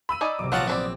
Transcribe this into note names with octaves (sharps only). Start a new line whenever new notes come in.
B5 E6 D#7
D#4 D5 G#5
B1 C3 D6
A#1 F#3 B3 F4 F#5 A5 A#5
B3 C4 B4 D5